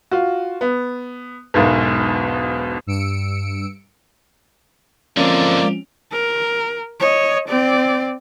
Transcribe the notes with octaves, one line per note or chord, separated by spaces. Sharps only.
F4 F#4
B3
E1 B1 G#2 B2
G2 E6 C#7 D7
G#2 D3 F3 A#3 C4 C#4 D5
A#4
C#5 D#5
C4 D5